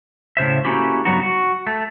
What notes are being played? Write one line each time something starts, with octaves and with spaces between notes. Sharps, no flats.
A2 C#3 C5 E5
A3 A#3 C#4 E4 F#4 G4
G2 C#3 F#3 B3 D#4 F#4
F#4
A3